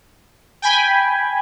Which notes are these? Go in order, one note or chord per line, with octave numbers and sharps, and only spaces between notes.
G5 G#5 B5